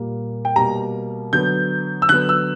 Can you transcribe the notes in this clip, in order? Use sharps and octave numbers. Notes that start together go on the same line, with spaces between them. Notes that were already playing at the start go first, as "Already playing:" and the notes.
Already playing: A#2 G3 A#3
G5
B2 G3 A#3 A#5
D3 F#3 B3 G6
E6
D3 F#3 B3 F#6
E6